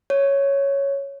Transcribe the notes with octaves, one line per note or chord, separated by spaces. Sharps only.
C#5